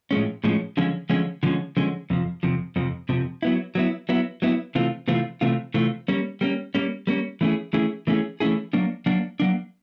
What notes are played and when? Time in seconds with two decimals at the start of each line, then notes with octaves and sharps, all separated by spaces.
0.11 A2 F3 G#3 C#4
0.44 A2 F3 G#3 C#4
0.77 D3 F3 G#3 C#4
1.10 D3 F3 G#3 C#4
1.43 D3 F3 G#3 C#4
1.77 D3 F3 G#3 C#4
2.10 F2 C3 F3
2.43 F2 C3 F3
2.76 F2 C3 F3
3.09 F2 C3 F3
3.43 F#3 B3 E4
3.75 F#3 B3 E4
4.09 F#3 B3 E4
4.42 F#3 B3 E4
4.75 C3 E3 A3 C4 F4
5.08 C3 E3 A3 C4 F4
5.41 C3 E3 A3 C4 F4
5.74 C3 E3 A3 C4 F4
6.08 G3 A#3 C#4
6.41 G3 A#3 C#4
6.75 G3 A#3 C#4
7.07 G3 A#3 C#4
7.41 E3 A3 C#4 E4 G#4
7.73 E3 A3 C#4 E4 G#4
8.07 E3 A3 C#4 E4 G#4
8.40 E3 A3 C#4 E4 G#4
8.73 F#3 A#3 D4
9.06 F#3 A#3 D4
9.40 F#3 A#3 D4